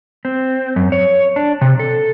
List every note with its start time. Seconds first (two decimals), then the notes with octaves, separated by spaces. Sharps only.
0.25 C4
0.76 F#2
0.92 C#5
1.36 D4
1.61 C3
1.79 A4